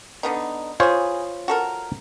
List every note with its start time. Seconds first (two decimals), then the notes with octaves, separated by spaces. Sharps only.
0.23 D3 B3 D#4
0.80 E3 F4 G#4 C5 C#5
1.48 F#4 A4 A#4